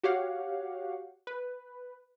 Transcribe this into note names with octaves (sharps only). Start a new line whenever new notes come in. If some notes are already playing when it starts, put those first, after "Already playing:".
F#4 G4 C#5 F5 F#5
B4